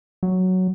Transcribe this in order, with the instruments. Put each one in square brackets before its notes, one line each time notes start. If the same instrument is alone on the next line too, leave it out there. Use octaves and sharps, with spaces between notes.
[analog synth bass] F#3